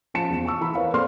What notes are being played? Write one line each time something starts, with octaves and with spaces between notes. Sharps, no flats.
F3 C#4 A5 C#7 E7
E2 C4
A5 C#6 E6
E3 A#5 B5
A#4 B4 C#5 F5
A#3 C4 A4 D5 C6 F6